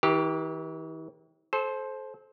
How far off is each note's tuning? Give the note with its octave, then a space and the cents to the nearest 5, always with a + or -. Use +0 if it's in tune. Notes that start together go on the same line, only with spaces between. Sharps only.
E3 -40 G4 +0 A#4 +15
A4 -30 C5 +10